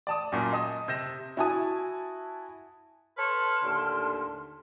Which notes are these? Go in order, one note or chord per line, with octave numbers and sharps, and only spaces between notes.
D5 A5 D#6
F#2 A#2
D#5 A5 D#6
C3 G6 A#6 E7
E4 F#4 G#5 A5 D#6
A4 B4 C#5 A5 C6 F6
D#2 A2 D3